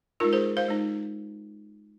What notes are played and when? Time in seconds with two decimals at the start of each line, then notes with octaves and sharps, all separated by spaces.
0.20 G#3 D#4 F4 A#4
0.33 G#4 C5
0.57 C5 F5
0.68 G#3 D#4